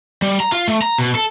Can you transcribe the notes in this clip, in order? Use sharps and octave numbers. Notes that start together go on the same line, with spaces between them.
G3
A#5
F4
A3
A#5
B2
A4